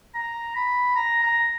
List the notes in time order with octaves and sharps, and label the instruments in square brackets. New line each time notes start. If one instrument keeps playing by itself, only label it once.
[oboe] A#5
B5
A#5
A#5